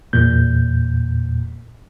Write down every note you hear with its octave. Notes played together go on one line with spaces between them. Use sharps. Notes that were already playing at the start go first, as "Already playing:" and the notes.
E2 A#2 G6